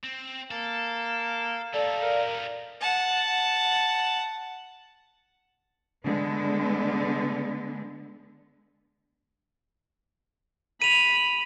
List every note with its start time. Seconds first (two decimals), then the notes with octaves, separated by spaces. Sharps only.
0.04 C4
0.51 A#3 A4
1.74 G3 D#4 A4 D5 F5
2.03 A#4
2.81 F#5 A5
6.05 D3 G#3 B3
10.82 B5 D#7 F7